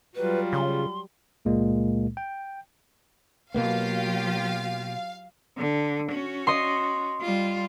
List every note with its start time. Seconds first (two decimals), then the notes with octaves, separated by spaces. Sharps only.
0.16 F#3 G3 F4 B4
0.53 C#3 C6
1.45 C#2 A#2 G#3 A#3
2.17 G5
3.54 B2 F#3 A#3 B3 F4 G4 F5
5.57 D3
6.11 C#4 F#4
6.47 D#5 C6
7.21 G3 F4